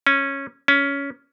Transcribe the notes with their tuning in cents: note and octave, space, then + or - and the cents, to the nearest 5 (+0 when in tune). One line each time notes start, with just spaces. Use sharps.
C#4 -10
C#4 +15